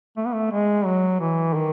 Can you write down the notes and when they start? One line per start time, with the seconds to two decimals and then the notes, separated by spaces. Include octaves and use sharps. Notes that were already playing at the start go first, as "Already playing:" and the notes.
0.17 A3
0.25 B3
0.33 A3
0.52 G#3
0.85 F#3
1.20 E3
1.54 D#3